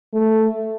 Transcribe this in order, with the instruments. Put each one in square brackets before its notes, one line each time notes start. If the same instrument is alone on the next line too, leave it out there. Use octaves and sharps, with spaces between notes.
[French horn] A3